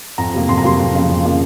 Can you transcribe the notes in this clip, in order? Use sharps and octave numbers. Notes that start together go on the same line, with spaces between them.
F2 A#5
C3 F#3 A#3
F2 C6
A#5
C3 F#3 A#3 C6
F2
C#3 F3 A#3
F2
C#3 F3 A#3